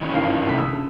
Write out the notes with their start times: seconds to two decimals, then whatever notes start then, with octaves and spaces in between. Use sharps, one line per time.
0.01 D#3 E3 C#4
0.14 G#1 G2 F5
0.28 F4
0.46 C2 A3 B6
0.58 C#3 D#6 E6
0.72 D4